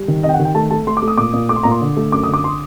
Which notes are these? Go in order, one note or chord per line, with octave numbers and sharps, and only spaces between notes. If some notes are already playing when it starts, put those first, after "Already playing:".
Already playing: G3
D#3
C3 D#5
G5
F#5
D#3
G5
A3 A5
A3 A5
A3 C6
D6
A3
D#6
A#2 D6
A#2
A3 D6
C6
A#2 A#5
C6
D3
A3
F#2 D6
D#6
D3
D6
C6